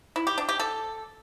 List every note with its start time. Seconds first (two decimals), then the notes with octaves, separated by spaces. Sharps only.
0.16 E4
0.27 G4
0.38 D4
0.49 G4
0.60 A4